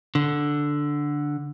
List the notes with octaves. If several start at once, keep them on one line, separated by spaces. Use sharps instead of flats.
D3